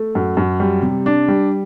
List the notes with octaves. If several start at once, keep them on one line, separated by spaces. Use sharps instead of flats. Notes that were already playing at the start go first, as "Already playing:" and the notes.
Already playing: A3
F#2
F#2
G3
C3
D4
G3